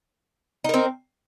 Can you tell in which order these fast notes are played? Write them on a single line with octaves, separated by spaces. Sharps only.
D#4 A#4 C4